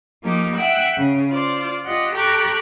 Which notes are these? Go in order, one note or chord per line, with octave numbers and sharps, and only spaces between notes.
F3 A#3 D#4 G4
E5 F#5 G5 E6 F#6
C#3
F4 C5 D5
F4 G4 D#5 F#5
G4 A4 G5 A#5 C#6 F#6